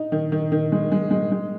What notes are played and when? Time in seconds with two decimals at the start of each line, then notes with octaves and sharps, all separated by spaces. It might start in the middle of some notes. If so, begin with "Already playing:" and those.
Already playing: D#4
0.12 D#3
0.32 D#3
0.52 D#3
0.72 G#3
0.92 G#3
1.11 G#3
1.31 G#3